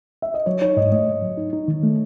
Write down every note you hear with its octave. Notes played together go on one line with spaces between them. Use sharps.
E5
D#5
F#3 C#5
D#4 C#5
G#2 D#5
A3 D#5
G#2
F#3
D#4
D#4
D#3
A3